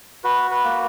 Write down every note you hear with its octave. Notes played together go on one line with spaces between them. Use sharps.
F#4 B4
B4
A#3